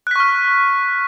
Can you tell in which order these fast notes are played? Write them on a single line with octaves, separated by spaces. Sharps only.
F#6 B6 C#6 F6